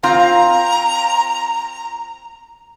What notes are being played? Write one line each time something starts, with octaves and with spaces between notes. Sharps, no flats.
C4 F4 F5 A#5